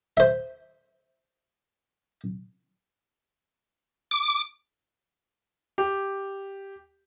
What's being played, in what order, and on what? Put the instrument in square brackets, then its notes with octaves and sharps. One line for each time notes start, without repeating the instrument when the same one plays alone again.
[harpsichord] C5 E5
[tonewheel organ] D6
[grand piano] G4